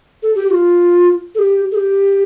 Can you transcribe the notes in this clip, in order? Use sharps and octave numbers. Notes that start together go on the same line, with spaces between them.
A4
G4
G4
F4
A4
G4
A4
G4